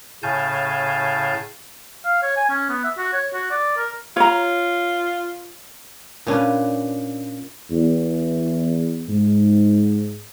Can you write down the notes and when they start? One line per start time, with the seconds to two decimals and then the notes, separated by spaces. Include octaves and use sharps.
0.23 A2 C#3 F5 G#5 A5 G6
2.05 F5
2.23 C#5
2.36 G#5
2.50 C#4
2.69 B3
2.84 E5
2.97 F#4
3.13 C#5
3.34 F#4
3.51 D5
3.77 A#4
4.17 F4 C#5 A#5
6.27 A#2 C#4 D4 B4
7.70 E2
9.09 G#2